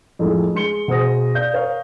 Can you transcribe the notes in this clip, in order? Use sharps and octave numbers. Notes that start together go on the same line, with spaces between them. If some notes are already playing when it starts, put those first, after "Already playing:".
F2 A2 G#3 A3
G#3 C6 C#7 G7
B2 G#4 C5 D#6 A#6
D5 F5 G6
A#4 C#5 F5